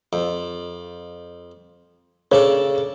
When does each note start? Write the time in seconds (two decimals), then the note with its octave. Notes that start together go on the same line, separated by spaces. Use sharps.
0.13 F2
2.32 C#3 D4 A4 C#5